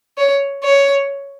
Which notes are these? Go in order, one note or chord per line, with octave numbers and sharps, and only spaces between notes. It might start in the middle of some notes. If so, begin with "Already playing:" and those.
C#5
C#5